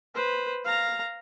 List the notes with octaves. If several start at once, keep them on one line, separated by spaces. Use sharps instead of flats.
B4 C5
F5 A#5